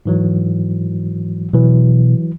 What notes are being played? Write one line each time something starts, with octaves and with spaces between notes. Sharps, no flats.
G#2 E3 F#3
B2 E3 F#3